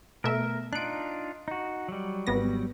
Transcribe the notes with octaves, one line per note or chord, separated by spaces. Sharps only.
B2 A3 A#4 E5
D4 D#4 F4 F#6 D7
D#4 F#4
F#3 G3
G#1 B3 A#6